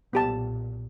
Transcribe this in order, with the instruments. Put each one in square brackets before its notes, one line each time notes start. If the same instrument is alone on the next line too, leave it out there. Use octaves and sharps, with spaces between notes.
[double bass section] B1 A#2 [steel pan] B3 G4 A5